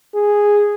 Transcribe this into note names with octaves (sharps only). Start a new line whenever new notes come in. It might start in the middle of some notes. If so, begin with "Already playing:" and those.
G#4